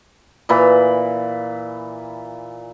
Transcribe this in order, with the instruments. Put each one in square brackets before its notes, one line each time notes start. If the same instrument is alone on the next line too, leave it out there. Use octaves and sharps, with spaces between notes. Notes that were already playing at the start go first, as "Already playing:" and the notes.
[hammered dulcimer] A#2 E3 B5